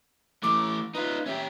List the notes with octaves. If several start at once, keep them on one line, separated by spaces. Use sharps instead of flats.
E3 A3 D6
D#4 F4 B4
C#4 G4 E5